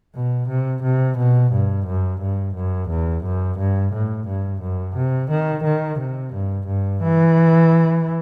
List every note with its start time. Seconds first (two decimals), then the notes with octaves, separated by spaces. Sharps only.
0.15 B2
0.49 C3
0.83 C3
1.18 B2
1.52 G2
1.87 F#2
2.21 G2
2.55 F#2
2.90 E2
3.24 F#2
3.58 G2
3.93 A2
4.27 G2
4.62 F#2
4.96 C3
5.31 D#3
5.64 D#3
5.99 C3
6.34 G2
6.68 G2
7.03 E3